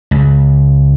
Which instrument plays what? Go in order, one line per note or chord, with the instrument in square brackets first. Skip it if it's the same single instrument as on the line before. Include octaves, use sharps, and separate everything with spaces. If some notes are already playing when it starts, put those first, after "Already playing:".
[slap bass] C#2